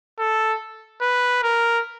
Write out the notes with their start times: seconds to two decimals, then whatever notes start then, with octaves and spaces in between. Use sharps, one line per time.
0.19 A4
1.01 B4
1.43 A#4